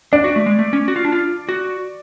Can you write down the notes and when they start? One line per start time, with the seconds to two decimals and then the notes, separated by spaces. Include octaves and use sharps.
0.13 D4 D5
0.24 F#4
0.36 A3
0.46 G#3
0.59 A3
0.73 C#4
0.88 F#4
0.96 F4
1.05 D4
1.12 F4
1.49 F#4